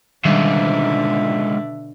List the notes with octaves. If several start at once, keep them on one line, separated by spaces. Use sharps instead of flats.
C#2 G#2 B2 D3 D#3 G3 D4 E5